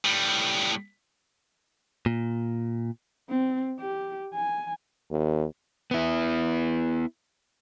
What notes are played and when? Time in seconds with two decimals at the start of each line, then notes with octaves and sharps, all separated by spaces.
0.05 A2 G3
2.06 A#2
3.30 C4
3.80 G4
4.34 G#5
5.11 D#2
5.91 B3 E4